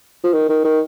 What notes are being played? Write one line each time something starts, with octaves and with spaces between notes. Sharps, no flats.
F3
D#3
D#3
D#3